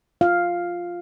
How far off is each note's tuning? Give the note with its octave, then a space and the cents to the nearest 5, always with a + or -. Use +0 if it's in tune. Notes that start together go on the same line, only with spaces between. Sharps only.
F4 +0 F5 +0